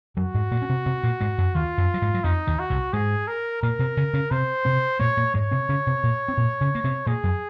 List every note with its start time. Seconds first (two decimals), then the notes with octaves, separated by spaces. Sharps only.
0.17 F#2 F#3 F#4
0.34 G#2 G#3
0.51 A#2 A#3
0.62 C#4
0.69 C3 C4
0.86 C3 C4
1.03 A#2 A#3
1.21 G#2 G#3
1.38 F#2 F#3
1.55 D#2 D#3 F4
1.78 F#2 F#3
1.94 F#3
2.02 G#2 G#3
2.14 F#3
2.24 F2 F3 D#4
2.47 D#2 D#3
2.59 F#4
2.70 C2 C3
2.93 G#2 G#3 G#4
3.28 A#4
3.62 A#2 A#3 A#4
3.79 C3 C4
3.97 C#3 C#4
4.13 C#3 C#4
4.31 C3 C4 C5
4.65 C3 C4
5.00 A#2 A#3 C#5
5.17 A#2 A#3
5.34 G#2 G#3 C#5
5.51 C3 C4
5.69 C#3 C#4
5.87 C3 C4
6.03 A#2 A#3
6.28 C4
6.37 A#2 A#3
6.61 C#3 C#4
6.75 A#3
6.84 C3 C4
7.06 A#2 A#3 G#4
7.24 F#2 F#3